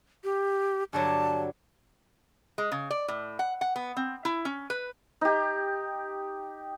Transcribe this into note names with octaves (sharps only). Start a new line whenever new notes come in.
G4
G2 D3 F#3 A5
G#3
C#3
D5
A2
F#5
F#5
B3
C4
E4
C#4
B4
D#4 G4